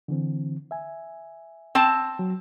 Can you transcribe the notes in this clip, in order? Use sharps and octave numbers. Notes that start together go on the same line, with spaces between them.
D3 E3 C4
E5 G#5
C4 A5
F#3